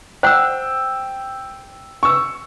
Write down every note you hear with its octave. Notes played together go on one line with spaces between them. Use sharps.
C5 F#5 G5 E6
C#6 E6